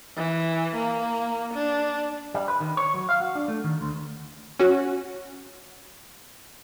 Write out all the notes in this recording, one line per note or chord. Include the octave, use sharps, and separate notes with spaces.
E3
A#3
D4
G3
B4
D#3
C#5
F#3
F5
F#4
D4
A3
D#3
D2
C#4 F#4